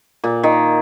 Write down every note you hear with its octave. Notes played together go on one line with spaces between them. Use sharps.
A#2
D#3